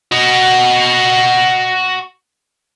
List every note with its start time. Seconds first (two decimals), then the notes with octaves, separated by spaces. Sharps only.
0.12 F#4 D#5